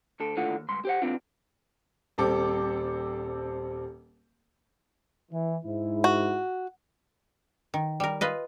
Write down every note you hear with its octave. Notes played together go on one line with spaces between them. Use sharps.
D2 D3 A4
D#2 A2 D3 F4 F#5
D#2
C#2 G2 C6
G4 C5 F#5
B1 B3 C4 D4 F4
D#1 G3 C4 A4 D6
E3
G#2 E4
F#4
D#3
G3 A#4
F4 B4 D#5